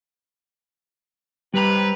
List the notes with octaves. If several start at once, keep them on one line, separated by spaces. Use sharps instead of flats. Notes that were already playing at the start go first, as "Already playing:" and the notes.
C3 G3 B4 A#5